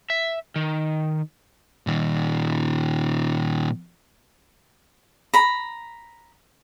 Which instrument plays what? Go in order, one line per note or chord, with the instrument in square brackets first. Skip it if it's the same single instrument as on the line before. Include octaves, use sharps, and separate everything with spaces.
[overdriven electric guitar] E5
D#3
[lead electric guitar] A#2 D#3
[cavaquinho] A#5 B5